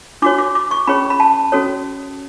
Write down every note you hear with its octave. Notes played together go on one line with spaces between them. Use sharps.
D4 F#4 C#5 D6
D6
D6
C#6
C#4 G#4 C#5 B5
B5
A5
C#4 F#4 A4 C#5